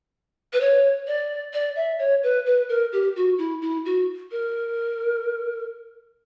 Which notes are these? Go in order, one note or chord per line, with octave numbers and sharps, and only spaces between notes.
B4
C#5
D5
D5
E5
C#5
B4
B4
A#4
G4
F#4
E4
E4
F#4
A#4